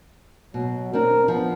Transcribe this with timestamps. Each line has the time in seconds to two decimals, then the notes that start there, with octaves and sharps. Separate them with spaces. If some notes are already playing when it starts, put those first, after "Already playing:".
0.54 B2 F#3
0.93 C4 D4 A#4
1.28 F3 B3